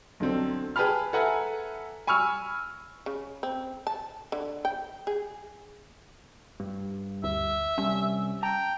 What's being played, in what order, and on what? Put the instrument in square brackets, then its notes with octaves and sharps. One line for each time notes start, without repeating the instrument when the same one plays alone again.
[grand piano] B1 D3 C4 A4
G#4 B4 G5 A5 B5 F6
A4 B4 E5 F#5 G#5 A#5
G#5 B5 C#6 E6 F6
[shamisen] C#3
C4
A5
D3
G5
G#4
[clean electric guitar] G2
[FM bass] D2 [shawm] E5
[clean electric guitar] C2 C#4 [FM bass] G3
[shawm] G5 [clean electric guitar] A5 A#5